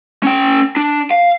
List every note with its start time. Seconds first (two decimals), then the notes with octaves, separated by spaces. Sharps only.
0.23 C#4 G5
0.77 D4
1.11 F5